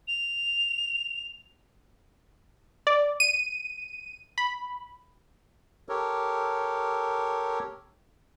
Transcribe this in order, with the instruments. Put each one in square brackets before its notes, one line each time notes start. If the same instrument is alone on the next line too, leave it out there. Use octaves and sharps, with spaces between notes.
[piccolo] F7
[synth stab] D5
D#7
B5
[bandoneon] G4 A4 A#4 C#5